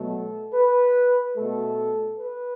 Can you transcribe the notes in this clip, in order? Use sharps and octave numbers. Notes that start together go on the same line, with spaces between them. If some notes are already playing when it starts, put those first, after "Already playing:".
Already playing: B2 F#3 A3 A4
B4
B2 A3 A4
B4